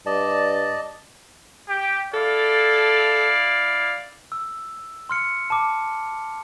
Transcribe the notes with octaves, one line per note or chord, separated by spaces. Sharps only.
G2 D5 D#5 A5
G4 G5
E4 A4 D5 F5
E6
C6 F6 C#7
A5 D6